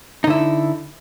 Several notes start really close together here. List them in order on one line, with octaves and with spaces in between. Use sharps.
D#4 D3 E4